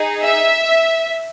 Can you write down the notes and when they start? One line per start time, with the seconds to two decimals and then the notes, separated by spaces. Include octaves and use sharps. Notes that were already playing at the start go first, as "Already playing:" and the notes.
Already playing: D#4 G#4
0.22 E5